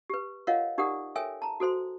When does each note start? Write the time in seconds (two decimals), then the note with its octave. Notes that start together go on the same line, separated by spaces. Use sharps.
0.10 G4 B4
0.47 F4 A#4 C#5 D#5 F5 F#5
0.78 D#4 G4 A#4 D5 F#5 D#6
1.15 A4 A#4 C#5 E5 G5 G#5
1.42 A5 A#5
1.60 F#4 A4 C5 C6